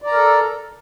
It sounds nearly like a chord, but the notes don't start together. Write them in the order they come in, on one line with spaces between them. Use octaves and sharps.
D5 A#5 A#4 A4